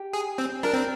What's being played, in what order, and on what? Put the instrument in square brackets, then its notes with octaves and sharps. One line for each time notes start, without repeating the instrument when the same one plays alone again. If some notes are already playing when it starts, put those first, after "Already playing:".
Already playing: [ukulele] G4
[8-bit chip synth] G#4
C4
[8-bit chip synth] D4 [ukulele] A#4
[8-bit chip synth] C4